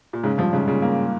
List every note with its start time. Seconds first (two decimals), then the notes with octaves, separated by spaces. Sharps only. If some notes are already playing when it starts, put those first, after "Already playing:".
0.13 A#2
0.24 G#2 C#3
0.38 G2 F3
0.53 G#2 C#3
0.68 A#2 C#3
0.82 A#3